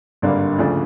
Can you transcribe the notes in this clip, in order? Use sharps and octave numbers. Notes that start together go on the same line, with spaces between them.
G#1 G2 D3 G3 A#3
D2 C#3 F3 A3 D4